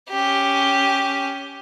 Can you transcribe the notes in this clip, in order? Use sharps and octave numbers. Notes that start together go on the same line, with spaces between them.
C#4 G4